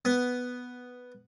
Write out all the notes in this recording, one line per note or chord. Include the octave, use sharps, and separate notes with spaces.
B3